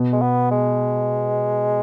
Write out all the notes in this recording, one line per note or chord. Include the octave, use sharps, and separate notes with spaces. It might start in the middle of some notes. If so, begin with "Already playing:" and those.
Already playing: B2
G#3
B3
G#3